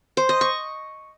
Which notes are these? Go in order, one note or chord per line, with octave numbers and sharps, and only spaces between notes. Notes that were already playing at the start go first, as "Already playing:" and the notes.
C5
D#5
C#6